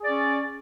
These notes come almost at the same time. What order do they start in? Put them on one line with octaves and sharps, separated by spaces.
G#4 D5 C#4